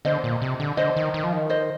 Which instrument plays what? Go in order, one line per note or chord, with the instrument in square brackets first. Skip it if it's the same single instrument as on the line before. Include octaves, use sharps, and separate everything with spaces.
[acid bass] D3 [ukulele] C5 D#5
[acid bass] A#2
C3
D3
[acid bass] D3 [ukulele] C5 D#5
[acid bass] D#3
D#3
F3
D#3
[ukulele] C5 D#5